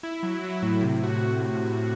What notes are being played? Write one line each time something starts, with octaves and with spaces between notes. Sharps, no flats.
E4
F#3
F#3
A2
C3
F#4